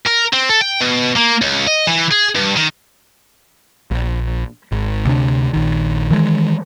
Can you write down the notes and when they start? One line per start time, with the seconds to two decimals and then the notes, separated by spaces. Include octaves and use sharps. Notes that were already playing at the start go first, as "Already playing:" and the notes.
0.06 A#4
0.33 C4
0.49 A4
0.61 G5
0.81 B2
1.17 A#3
1.42 C#2
1.67 D#5
1.87 E3
2.12 G#4
2.36 G2
2.57 D#3
3.91 A#1
4.72 G#1
5.05 D2 C3 D4
5.53 A#1 D#3
6.11 D#3 E3 G#3